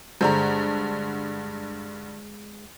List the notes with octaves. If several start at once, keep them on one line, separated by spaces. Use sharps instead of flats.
G2 D3 G#3 G#4 C5 A#5